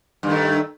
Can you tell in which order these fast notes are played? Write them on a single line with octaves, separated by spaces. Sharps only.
G2 D#3 A3